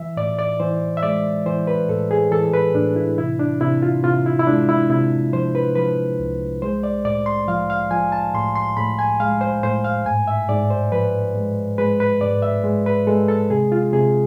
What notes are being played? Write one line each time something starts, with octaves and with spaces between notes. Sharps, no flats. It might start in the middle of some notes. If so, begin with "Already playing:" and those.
Already playing: E3 E5
A2 D5
D5
E3 C5
E5
G#3 D5
E3 C5
B4
A2 A4
G#4
E3 A4
B4
A2 D4
E4
C3 E4
D4
C3 E4
F4
C3 F4
E4
E4
G#3 D4
E4
C3 E4
F3 C5
B4
F3 B4
C2
G#3 C5
D5
A2 D5
C6
F3 F5
F5
F3 G#5
A5
A2 C6
C6
A2 B5
G#5
G#3 F5
C5
A2 C5
F5
G#2 G#5
E5
G#2 D5
C5
F3 B4
G#3
G#3 B4
B4
G#2 D5
E5
G#3
B4
G#3 A4
A4
C3 G#4
F4
C3 G#4